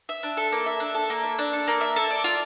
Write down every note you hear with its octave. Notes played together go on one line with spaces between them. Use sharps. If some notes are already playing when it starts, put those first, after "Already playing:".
E5
D4
A4
A#3
E5
D4
A4
A#3
E5
D4
A4
A#3
E5
A4
D5
F4